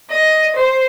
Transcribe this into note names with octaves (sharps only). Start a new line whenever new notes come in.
D#5
C5